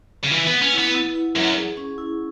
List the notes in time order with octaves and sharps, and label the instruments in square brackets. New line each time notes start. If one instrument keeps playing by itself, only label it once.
[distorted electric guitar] C#3
[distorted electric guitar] E3 [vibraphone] B4
[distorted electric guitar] B3 [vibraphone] F#5
[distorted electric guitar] C#4
[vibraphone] E4
[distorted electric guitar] B3
[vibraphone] E4
E4
[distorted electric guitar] F#2 [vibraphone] F#5
[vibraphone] G#4
C#4
E4